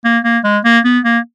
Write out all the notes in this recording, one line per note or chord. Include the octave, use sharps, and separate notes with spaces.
A#3
A#3
G#3
A#3
B3
A#3